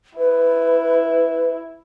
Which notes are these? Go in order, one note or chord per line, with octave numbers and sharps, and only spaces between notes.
E4 B4